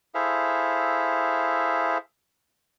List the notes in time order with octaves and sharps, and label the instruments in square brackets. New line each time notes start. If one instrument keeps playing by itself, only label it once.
[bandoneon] E4 G#4 A4 C5 E5 F5